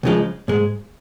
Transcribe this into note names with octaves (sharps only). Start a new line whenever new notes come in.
C#2 C#3 F3 G#3
G#2 G#3